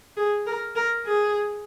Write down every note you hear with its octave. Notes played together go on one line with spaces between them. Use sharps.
G#4
A#4
A#4
G#4